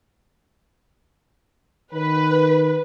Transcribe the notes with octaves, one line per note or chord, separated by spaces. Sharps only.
D#3 B4